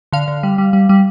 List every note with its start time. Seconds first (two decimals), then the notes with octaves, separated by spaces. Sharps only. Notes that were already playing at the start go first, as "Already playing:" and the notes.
0.12 D3 F5
0.28 D3
0.43 G3
0.58 G3
0.73 G3
0.89 G3